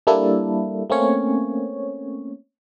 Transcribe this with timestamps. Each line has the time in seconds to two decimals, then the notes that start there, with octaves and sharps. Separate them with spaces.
0.07 G3 A#3 D4 E4 A4
0.90 A3 A#3 C4 C#4 C#5